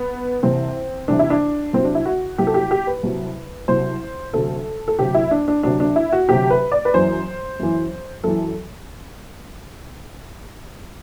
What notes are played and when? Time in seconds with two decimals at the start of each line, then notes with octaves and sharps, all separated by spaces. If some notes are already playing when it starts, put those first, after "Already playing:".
Already playing: B3
0.43 C2 C3 E3 C4
1.08 C2 C3 E3 D4
1.19 E4
1.30 D4
1.73 C2 C3 F#3 C4
1.85 D4
1.95 E4
2.05 F#4
2.38 C2 C3 F#3 G4
2.47 A4
2.54 G4
2.71 G4
2.87 B4
3.03 C2 C3 F#3
3.68 C2 C3 F#3 C5
4.33 D2 C3 F#3 A4
4.88 A4
4.98 D2 C3 F#3 G4
5.15 E4
5.31 D4
5.48 D4
5.63 D2 C3 F#3 D4
5.80 D4
5.96 E4
6.13 F#4
6.29 D2 C3 F#3 G4
6.50 B4
6.72 D5
6.85 B4
6.94 F#2 E3 C5
7.59 F#2 E3
8.24 F#2 E3 A4